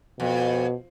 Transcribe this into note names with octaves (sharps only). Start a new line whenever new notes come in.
F2 B2